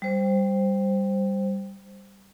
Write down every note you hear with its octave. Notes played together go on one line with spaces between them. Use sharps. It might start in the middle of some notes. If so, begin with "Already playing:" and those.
G3 C5